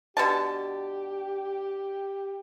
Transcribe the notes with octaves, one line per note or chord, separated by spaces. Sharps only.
B2 D3 G4 A5